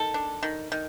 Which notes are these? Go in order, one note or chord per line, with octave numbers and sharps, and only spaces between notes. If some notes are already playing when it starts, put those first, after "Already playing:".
Already playing: D#3 A4
D4
D#3
D#3